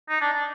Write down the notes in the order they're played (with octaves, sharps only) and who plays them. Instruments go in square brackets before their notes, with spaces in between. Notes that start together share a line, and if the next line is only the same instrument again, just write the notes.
[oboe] D#4
D4
D4